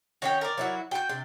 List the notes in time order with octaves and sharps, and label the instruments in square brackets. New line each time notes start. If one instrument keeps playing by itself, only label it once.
[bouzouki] D#3 C#4 [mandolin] F#4 C#5 G5
[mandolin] A#4 D5
[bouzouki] F#3 E4 F#4
[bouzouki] F#4 [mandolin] G5 G6
[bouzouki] C3 D4